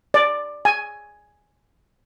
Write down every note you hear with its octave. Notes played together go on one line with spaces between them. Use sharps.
D5
G#5